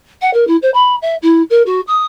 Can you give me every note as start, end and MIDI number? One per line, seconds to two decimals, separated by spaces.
0.21 0.30 78
0.33 0.47 70
0.47 0.56 64
0.62 0.70 72
0.74 0.96 83
1.02 1.15 76
1.22 1.42 64
1.50 1.63 70
1.66 1.81 66
1.87 2.05 87